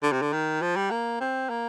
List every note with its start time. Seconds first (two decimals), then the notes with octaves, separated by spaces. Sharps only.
0.03 D3
0.12 C3
0.22 D3
0.33 D#3
0.62 F3
0.76 G3
0.91 A#3
1.21 C4
1.50 A#3